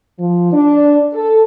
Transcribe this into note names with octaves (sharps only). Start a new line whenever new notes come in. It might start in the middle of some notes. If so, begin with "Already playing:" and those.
F3
D4
A4